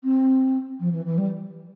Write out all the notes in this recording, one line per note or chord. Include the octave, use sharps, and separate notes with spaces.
C4
F3
E3
E3
G3